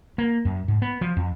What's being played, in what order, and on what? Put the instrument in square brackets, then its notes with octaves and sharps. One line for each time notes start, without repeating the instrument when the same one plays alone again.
[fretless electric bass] A#3
F#2
G#2
B3
F3
F2